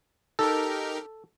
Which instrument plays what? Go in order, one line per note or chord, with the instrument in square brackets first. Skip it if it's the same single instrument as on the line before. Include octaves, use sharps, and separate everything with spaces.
[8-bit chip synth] D#4 G4 A#4 [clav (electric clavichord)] A4